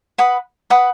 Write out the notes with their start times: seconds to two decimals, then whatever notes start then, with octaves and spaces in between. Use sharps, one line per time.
0.18 B4 F#5 B5 D#6
0.70 B4 F#5 B5 D#6